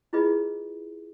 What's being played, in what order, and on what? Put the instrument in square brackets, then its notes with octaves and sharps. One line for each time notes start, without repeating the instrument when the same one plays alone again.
[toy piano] E4 F4 G#4 B4 D#5